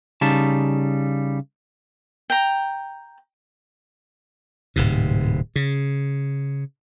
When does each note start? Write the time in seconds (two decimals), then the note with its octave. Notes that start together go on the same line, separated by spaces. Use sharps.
0.21 C#3 G3 D#4 A5
2.30 G5 A#5
4.76 D1 G#2 C3
5.56 C#3